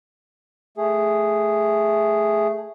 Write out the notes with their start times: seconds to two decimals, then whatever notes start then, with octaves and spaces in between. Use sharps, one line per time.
0.77 A3 G#4